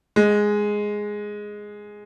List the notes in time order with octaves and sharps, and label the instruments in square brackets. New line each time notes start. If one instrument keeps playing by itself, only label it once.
[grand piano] G#3